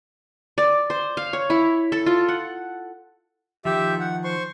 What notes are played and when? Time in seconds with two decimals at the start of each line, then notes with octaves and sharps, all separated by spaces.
0.58 D5
0.90 C5
1.17 F5
1.33 C#5
1.50 E4
1.92 A4
2.06 F4
2.28 F#5
3.65 D#3 F3 G4 E5
4.00 F#5
4.24 C5 C6 C#6